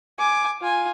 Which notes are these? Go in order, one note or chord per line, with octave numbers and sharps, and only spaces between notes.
G#5 D6
F4 G#5